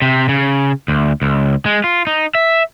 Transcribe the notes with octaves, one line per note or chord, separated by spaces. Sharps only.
C3
C#3
D2
C#2
G#3
F4
D#4
E5